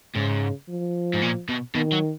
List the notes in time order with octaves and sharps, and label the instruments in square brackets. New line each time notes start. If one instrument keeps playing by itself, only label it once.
[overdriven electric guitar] G#2 [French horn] C#3
[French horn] F3
[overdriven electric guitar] G#2
A#2
B2
[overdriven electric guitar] B2 [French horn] D#3
[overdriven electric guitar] F#3